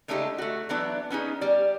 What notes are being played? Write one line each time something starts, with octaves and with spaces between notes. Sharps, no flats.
C#3 G#3 A3 D4 D#4 G4
A3 F#4
E3 F#3 B3 D4 E4
B3 C#4 D#4 G#4
G3 D5